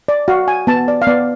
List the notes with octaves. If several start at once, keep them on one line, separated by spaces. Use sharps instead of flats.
D5
F#4 F5
G#5
B3 A5
D5
F5
B3 D5